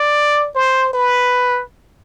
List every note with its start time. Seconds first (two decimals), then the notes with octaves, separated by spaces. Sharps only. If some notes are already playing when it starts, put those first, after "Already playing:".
Already playing: D5
0.55 C5
0.93 B4